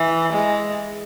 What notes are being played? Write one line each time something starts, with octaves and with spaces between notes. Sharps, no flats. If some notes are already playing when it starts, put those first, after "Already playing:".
Already playing: E3
G#3